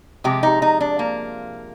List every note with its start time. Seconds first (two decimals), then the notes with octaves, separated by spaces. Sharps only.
0.24 C3 F3 G#3 G4
0.43 D#4
0.62 D#4
0.81 D4
0.99 A#3